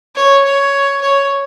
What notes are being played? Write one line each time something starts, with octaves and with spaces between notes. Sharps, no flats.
C#5
C#5
C#5